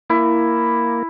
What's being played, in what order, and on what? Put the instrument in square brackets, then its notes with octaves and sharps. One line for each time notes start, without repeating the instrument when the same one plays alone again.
[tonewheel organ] A#3 [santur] E4